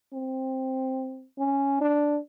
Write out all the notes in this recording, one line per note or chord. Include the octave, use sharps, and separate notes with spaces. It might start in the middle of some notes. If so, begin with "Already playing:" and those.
C4
C#4
D4